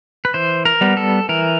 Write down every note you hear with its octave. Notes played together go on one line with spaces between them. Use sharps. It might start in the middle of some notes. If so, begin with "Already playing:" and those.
B4
E3 C5
A#4
G3 B3
A4
E3 A#4